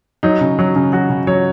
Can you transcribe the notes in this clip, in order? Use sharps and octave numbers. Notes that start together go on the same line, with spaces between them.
F#3 D#4
C#3
F#3
C#3
F#3 F#4
C#3
F#3 C#5